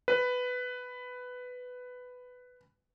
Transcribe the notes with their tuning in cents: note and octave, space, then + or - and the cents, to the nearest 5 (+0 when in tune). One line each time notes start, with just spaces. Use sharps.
B4 +10